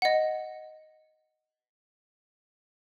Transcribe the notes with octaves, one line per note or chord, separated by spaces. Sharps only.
D#5 F#5